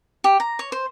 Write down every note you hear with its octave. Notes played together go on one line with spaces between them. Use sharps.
G4
A#5
C#5
C5